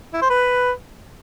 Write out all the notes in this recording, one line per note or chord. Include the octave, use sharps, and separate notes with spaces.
E4
C5
B4